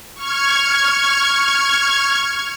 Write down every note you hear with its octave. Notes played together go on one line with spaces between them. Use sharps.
C#6 F6 G#6